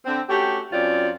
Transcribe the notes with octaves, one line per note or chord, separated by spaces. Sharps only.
D3 C4
A3 C#4 F#4 G4
F#2 C4 C#4 F4 D5